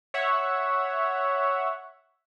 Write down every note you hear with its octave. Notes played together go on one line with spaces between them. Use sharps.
C#5 E5 F#5